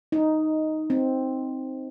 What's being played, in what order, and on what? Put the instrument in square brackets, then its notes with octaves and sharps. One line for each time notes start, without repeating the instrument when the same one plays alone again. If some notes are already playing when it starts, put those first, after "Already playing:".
[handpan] D#4
C4